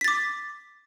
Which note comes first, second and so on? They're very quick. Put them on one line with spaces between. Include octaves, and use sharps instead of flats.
B6 A6 D6